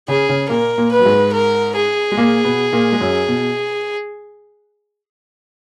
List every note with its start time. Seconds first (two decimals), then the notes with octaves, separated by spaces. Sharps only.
0.08 C#3 C#4 G#4
0.29 C#3 C#4
0.50 A#2 A#3 A#4
0.78 A#2 A#3
0.92 B4
0.99 F#3
1.05 G#2 G#3
1.33 A#4
1.76 G#4
2.11 G#3
2.17 A#2 A#3
2.44 B2 B3
2.72 A#2 A#3
2.92 G#3
3.01 F#2 F#3
3.28 B2